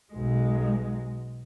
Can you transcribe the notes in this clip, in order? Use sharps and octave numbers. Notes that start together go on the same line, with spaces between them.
B1 G#3